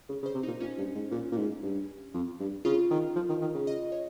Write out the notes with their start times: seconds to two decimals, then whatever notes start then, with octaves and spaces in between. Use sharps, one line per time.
0.09 C#3
0.22 C#3
0.26 C5
0.34 C3
0.43 A#2 D#4
0.60 A#2 C#4
0.78 G2
0.95 G#2
1.11 A#2
1.32 A#2
1.37 G#2
1.63 G2
2.13 F2
2.39 G2
2.65 C#3 F4
2.91 D#3
3.16 F3
3.29 D#3
3.41 D#3
3.54 C#3
3.67 D#5
3.92 C#5